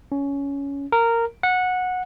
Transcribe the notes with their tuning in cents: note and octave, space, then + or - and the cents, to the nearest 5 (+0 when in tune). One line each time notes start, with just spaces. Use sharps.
C#4 +15
A#4 -10
F#5 -15